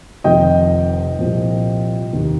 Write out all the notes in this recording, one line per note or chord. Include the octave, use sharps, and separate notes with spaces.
F1 F2 D#3 D#5 G5
C2 A#2 F3
F1 D#2 D#3